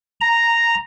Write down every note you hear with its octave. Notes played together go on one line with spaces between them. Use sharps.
A#5